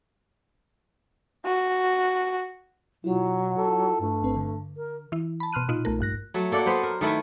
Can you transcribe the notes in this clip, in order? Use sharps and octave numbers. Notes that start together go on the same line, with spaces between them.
F#4
B2 F#3 E4 F4
A4
G2 A3
G1 C4 B4
D3
A#4
E3 E4
A5 B5
B2 C6 F6 F#6 D#7
A#2 D#4 F4
B1 A3 A#4
A#1 G2 F#6 A#6
F#3 A3
A#3 A4 D5 F#5
B3 B4 C5
A#4
D#3 A3 E4 B4